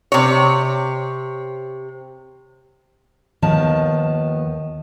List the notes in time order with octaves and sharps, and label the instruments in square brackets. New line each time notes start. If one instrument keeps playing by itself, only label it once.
[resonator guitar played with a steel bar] C3 C#5
[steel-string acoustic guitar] D#2 D#3 F3 B3 A5